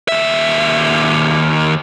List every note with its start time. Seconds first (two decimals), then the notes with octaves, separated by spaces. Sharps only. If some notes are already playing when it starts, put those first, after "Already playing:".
0.08 D#2 E5